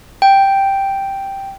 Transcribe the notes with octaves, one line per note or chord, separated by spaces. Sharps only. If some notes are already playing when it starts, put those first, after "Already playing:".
G5